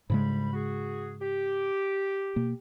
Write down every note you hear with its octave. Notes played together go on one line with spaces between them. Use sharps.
D2 G#2 C#3 G3 G#3 B5
F#4 G#4
G4
B2 A#3